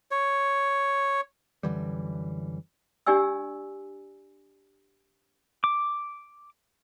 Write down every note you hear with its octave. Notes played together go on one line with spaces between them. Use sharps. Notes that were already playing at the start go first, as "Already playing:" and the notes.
C#5
F#2 D3 E3 G3
D4 G4 D5 G#5 E6
D6